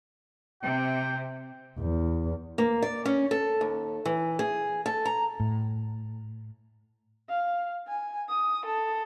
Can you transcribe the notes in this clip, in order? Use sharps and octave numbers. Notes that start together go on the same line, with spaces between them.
C3 G5
E2
A#3
D5
C#4
A4
D#2
E3
G#4
A4
A#5
A2
F5
G#5
D#6
A4